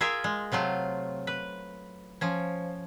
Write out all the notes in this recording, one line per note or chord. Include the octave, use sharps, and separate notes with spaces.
F4 G#4 A#4 E5
G#3
C3 F#3 A3 F4
B4
F3 C#4